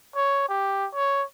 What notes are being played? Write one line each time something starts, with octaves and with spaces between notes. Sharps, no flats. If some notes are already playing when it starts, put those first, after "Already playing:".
C#5
G4
C#5